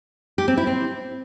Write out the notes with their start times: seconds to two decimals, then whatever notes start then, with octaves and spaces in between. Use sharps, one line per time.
0.38 G4
0.48 C4
0.57 E4
0.67 C4